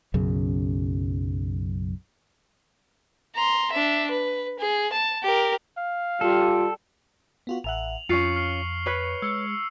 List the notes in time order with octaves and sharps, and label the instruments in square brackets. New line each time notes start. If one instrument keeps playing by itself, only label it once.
[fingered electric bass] B1 F#2 C#3
[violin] A#5 C6
D4 E5
B4
G#4
A5
G4 A#4
[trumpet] F5
[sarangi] G3 [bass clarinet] F4 [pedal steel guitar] A4
[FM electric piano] B3 F4 F#4
[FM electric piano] A1 E5 F#5 [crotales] F7 F#7
[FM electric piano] F2 [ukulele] C#4 F4 [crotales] C#6 C7 C#7
[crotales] F6 C7
[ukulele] B4 C#5
[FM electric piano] G#3 C#7 [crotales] E6